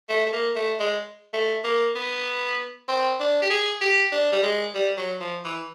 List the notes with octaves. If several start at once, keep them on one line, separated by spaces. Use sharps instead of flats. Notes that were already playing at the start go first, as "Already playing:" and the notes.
A3
A3
A#3
A3
G#3
A3
A#3
B3
C4
D4
G4
G#4
G4
D4
G3
G#3
G3
F#3
F3
E3